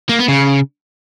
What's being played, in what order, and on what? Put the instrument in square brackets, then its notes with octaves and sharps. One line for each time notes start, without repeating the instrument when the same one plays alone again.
[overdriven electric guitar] A#3
B3
C#3